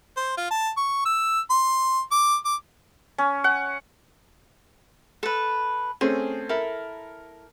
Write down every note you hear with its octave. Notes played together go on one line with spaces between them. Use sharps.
C5
F4
A5
C#6
E6
C6
D6
D6
C#4
F#5
A4 B4
A3 C4 C#4 G#4
E4 A4 A#4